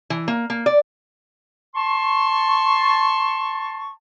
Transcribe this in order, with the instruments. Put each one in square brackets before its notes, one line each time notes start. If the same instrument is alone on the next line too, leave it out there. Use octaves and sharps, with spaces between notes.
[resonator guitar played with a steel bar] E3
A#3
A#3
D5
[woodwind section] A5 C6 C#6